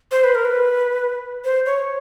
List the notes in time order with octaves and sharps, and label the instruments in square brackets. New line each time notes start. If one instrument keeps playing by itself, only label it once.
[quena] C5
B4
A#4
B4
C5
C#5